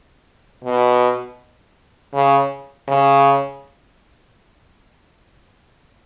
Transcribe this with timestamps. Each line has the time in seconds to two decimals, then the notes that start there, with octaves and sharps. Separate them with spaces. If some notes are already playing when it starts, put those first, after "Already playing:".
0.64 B2
2.14 C#3
2.88 C#3